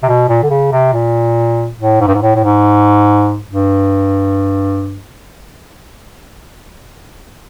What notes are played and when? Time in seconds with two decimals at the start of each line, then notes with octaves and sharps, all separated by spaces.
0.03 C3
0.08 B2
0.29 A#2
0.43 D3
0.50 C#3
0.72 C3
0.93 A#2
1.80 A2
2.01 G#2
2.07 G2
2.15 G#2
2.22 A2
2.35 A2
2.43 G#2
3.51 G2